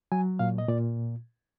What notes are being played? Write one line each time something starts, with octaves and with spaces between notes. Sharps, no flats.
F#3 G#5
A#2 F5
D#5
A#2 D5